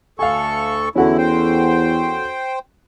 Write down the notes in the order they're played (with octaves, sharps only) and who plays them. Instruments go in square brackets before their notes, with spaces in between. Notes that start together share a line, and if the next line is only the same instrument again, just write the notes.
[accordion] D2 A4 C#6 [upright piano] F5 G#5
[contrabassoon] E2 [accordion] D3 E4 [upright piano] C#4 F#4 A4
[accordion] C5 G5